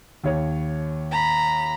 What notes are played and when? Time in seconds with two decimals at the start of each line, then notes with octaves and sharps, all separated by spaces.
0.24 D#2 C#5
1.11 A#5 B5